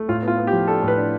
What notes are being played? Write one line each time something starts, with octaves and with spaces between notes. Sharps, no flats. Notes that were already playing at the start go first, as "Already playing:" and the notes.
Already playing: A3
A2 F4
B3
F4
B3
G4
F3
D4 A4
A2
B4
D4